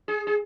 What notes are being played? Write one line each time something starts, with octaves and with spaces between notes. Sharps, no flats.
G#4
G#4